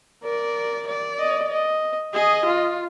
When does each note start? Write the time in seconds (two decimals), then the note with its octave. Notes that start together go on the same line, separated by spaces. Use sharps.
0.24 A#4 D5
0.87 D5
1.19 D#5
1.51 D#5
2.14 G#4 D#5
2.46 F4